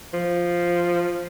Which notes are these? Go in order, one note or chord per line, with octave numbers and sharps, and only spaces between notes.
F3